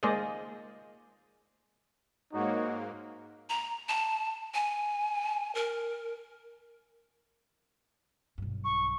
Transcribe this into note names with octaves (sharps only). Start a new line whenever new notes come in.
G#3 A#3 G#4 C5 D5 D#5
G#2 A#3 D#4 F#4 C#5
A#5
A5
G#5
A#4
B1 G2
C#6